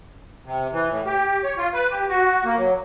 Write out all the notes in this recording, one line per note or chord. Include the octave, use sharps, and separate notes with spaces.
C3
E3
A2
G4
C#5
F4
B4
G4
F#4
A#3
F#3